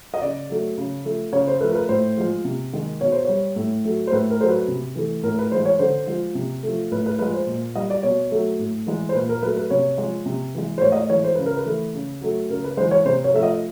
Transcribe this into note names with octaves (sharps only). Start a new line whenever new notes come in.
D#5
C#3 D5
F#3 A3
C#3
F3 A3
C#3 C#5
C5
F3 A3 B4
A#4
B4
A2 C5
F3 G#3
C3
D#3 G#3
B2 C#5
C5
G3 C#5
A2
F#3 A3
C5
A2 B4
A#4
F#3 A3 C5
B4
C3
E3 A3
A2 A#4
B4
E3 G#3 C5
C#5
D3 C5
F3 G#3
C3
F3 A3
A2 B4
B4
F3 G#3 B4
C5
A#2
G3 D#5
D5
B2 C#5
F#3 A3
A2
E3 G#3
C5
A#2 B4
A#4
F#3 A3 B4
B4
C3 C#5
F3 G#3
C3
E3 G#3
C5
A2 C#5
D#5
D5
E3 G#3 C#5
C5
C#3 B4
A#4
B4
E3 A3
C#3
F#3 A3
C#3 A#4
B4
E3 G#3 C5
C#5
C3 C5
C#5
F3 A3 E5
D#5